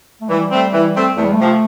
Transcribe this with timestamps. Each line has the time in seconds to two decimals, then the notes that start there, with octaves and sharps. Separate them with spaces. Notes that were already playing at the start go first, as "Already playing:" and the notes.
0.21 A3
0.29 E3 G3
0.51 A3 C4
0.73 E3
0.95 A3 C4
1.16 E2 A3
1.25 G3
1.33 A3
1.39 C3 F3